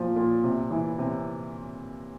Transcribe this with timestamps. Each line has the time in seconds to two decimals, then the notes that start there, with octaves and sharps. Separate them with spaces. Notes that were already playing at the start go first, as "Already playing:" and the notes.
Already playing: A#2 F3
0.16 A#2
0.44 C3
0.71 E3
0.98 C3